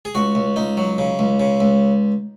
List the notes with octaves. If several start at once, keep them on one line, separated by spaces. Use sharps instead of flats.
G#4
C#2 F#4
C#2
C#2 D#4
F#3
C#3
C#2
C#3
C#2